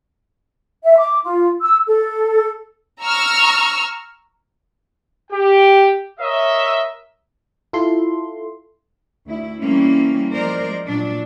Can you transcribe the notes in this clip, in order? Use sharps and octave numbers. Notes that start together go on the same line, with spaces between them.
E5
D6
F4
E6
A4
A#5 C#6 E6 F6
G4 G5
A#4 C#5 D#5 E5
E4 F4 A4 C6
D2 E4
E3 G3 A#3 C4 C#4
F3 G#3 A#4 C5 D5
A#2 F#3 D4